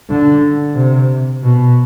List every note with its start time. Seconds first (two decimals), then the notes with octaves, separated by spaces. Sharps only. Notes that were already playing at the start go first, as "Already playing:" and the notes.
0.09 D3
0.75 C3
1.43 B2